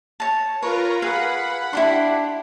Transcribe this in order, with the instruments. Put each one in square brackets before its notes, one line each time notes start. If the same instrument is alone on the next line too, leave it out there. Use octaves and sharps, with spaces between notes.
[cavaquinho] C#5 A5
[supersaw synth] F4 A#4 A#5 [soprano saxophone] B4 [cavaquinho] C#5
[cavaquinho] G#4 F5 [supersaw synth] F#5 B5
[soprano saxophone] D4 [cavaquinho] E4 G4 C6